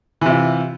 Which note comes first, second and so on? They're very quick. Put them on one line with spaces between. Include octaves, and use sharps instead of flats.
E3 C3 F4